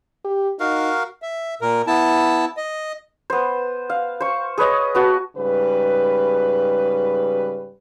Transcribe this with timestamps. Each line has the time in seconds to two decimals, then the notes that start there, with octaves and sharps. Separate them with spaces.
0.25 G4
0.60 D#4 F#4 A#4 F5
1.22 E5
1.61 A#2 A#4
1.87 B3 E4 A5
2.57 D#5
3.30 B3 C5
3.90 F5
4.20 C5 C#6
4.58 G#4 B4 C#5 D#5
4.95 B3 F#4 A5
5.36 G#2 C#3 G3 B4